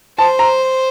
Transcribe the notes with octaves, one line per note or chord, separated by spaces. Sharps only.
C5 A5
A#5